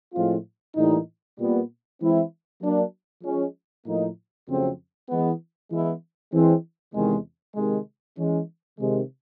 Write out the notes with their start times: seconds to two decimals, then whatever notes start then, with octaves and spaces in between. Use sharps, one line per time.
0.14 A2 F3 G#3 C4 F4
0.75 A2 E3 G3 A#3 D#4
1.38 A#2 G3 B3
2.00 E3 G#3 C4 E4
2.61 F#3 A#3 D4
3.23 F3 G#3 C#4
3.85 A2 F3 A#3 D#4
4.47 F2 C#3 F#3 A3 C4
5.09 E3 G#3 B3
5.70 E3 G#3 B3 E4
6.32 E3 G#3 C4
6.93 E2 C3 D#3 G#3
7.55 C3 D#3 G#3
8.18 E3 G#3 C#4
8.79 C3 D#3 G#3